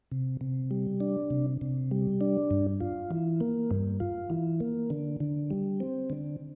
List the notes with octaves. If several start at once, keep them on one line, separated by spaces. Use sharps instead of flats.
C3
C3
G3
D4
C3
C3
G3
D4
G2
F4
E3
A#3
G2
F4
E3
A#3
D3
D3
G3
C4
D3